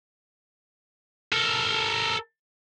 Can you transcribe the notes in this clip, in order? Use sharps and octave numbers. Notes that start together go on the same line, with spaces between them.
A4 A#4